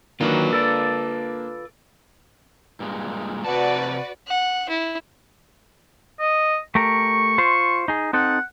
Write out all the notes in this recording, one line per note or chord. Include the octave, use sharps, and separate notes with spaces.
D#3 F#3 A#3 D4 F4 B4
A4 D5
G2 A#2 G#3
C3 F#4 B4 D5 A5
F#5
E4
D#5
A3 G4 A#4 C#6
F4 C5
D#4 G#4
C4 D#4 A4 F#5